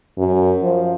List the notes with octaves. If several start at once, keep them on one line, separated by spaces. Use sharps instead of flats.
F#2
F3